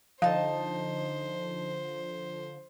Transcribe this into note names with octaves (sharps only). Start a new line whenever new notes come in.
D3 F3 D#4 C5 F5 A5